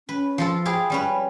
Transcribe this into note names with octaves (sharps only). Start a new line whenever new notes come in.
C#4 B4
F3 F4 A4
G4 G#4 F5 B5
G3 C#4 B4